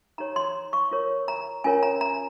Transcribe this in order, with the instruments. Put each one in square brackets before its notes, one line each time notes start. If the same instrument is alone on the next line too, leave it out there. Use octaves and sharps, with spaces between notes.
[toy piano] D#4 G4 C#5 A#5
C6
C#6
F4 A#4 C#5
A#5
C#4 F4 A#4 C#5 G#5
A#5
A#5